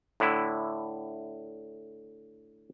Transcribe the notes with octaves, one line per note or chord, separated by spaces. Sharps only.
A2 D3 E4